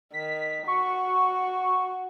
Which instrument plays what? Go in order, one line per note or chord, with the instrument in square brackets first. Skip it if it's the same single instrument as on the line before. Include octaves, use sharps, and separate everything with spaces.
[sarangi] D#3 [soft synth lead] B6
[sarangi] F#4 [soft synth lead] C#6